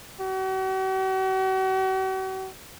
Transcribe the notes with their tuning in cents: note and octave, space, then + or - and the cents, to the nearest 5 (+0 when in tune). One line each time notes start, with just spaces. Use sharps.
F#4 +45